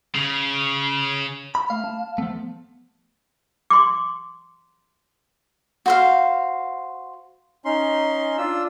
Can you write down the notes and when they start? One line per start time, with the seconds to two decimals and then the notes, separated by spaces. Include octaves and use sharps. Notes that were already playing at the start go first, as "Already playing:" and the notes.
0.15 C#3
1.55 B5
1.70 A3 F5
1.84 A5
2.18 F3 A3 B3
3.70 C6 D6
5.86 F#4 C5 F5
7.65 C#4 D#4 C6
8.38 D4 F4 E6